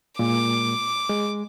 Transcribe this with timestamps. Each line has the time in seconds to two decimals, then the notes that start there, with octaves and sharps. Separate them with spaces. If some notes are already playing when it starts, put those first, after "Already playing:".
0.19 A#2 G#3 D6
1.10 G#3